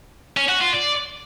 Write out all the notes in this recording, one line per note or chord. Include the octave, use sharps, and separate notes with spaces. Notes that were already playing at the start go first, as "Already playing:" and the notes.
C#4
F#4
F4
D5